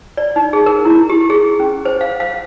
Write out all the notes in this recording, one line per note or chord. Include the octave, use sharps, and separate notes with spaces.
D5
D#4
G#4
A#4
E4
G4
G#4
C#4
C5
F5
F5